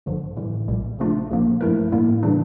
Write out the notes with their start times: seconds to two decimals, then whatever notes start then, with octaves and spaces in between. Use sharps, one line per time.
0.06 A1 G2 D3 F3
0.36 A2 E3 G3
0.67 A#1 A#2 G3
0.98 C#3 F3 A3 D4 F4
1.30 A#1 A#2 F3 A#3
1.61 G2 F3 A3 E4 A#4
1.92 A2 G3 A#3 E4
2.23 C#3 E3 G3 D4